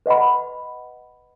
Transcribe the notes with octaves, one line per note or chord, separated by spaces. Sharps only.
B4 D#5 F#5 B5